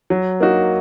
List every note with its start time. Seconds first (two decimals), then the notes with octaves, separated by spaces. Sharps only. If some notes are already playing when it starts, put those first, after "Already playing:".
0.10 F#3
0.40 A#3 D#4 F#4